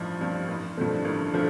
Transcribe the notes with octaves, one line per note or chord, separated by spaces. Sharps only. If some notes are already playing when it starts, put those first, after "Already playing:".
Already playing: A1 G2 F3
G2 F3
A1
G2 D3 F3 A3
A1
D3 F3 A3